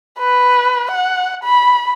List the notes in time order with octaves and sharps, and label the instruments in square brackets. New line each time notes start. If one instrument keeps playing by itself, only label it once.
[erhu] B4
F#5
B5